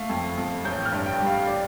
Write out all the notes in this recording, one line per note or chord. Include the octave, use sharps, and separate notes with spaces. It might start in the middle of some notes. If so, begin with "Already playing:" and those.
Already playing: A3 F5
F2
F2
A1 G6
F6
G2
G5
G3
F5
D5